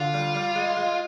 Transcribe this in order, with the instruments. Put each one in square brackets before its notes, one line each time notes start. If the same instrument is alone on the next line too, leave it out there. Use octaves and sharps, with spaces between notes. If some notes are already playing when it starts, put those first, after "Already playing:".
Already playing: [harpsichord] D3 [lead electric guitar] F4
[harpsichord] G3
G3
G#3
G#3